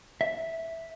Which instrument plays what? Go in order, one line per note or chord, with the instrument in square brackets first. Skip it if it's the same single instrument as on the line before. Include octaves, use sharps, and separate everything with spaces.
[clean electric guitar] E5